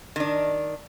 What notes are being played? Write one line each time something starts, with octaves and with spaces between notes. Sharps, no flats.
D#3 D4